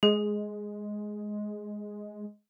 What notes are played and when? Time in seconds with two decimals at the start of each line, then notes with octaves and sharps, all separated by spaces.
0.03 G#3 G#4